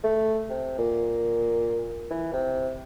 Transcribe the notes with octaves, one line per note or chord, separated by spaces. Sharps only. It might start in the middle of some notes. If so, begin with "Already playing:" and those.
A3
C3
A#2
E3
C3